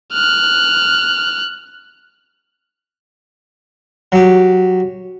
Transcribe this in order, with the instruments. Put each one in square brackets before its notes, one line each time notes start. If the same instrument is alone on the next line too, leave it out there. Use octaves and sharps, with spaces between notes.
[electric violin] F6 F#6
[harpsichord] F#3 G4